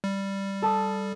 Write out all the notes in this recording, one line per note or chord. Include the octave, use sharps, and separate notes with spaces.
G3
A4 A5 D#6